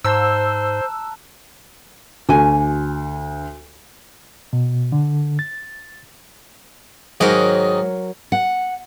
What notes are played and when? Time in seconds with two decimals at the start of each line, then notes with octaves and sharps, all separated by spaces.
0.05 G#2 C5 A5 A#5 E6 F#6
2.29 D2 F#4 G#5
4.53 B2
4.92 D3
5.39 A6
7.20 G#2 D#3 F#3 A#4 G#5
8.32 F#5